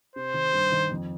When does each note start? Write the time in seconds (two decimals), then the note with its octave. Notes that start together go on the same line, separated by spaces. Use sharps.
0.16 C3 C5
0.34 D#3
0.53 G2
0.72 D#3
0.91 F2